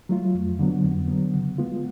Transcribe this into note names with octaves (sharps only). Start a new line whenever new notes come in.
F#3 A3 F4
F2
D3 F#3 B3
F2
D3 F#3 B3
C#3
G#3 B3 F4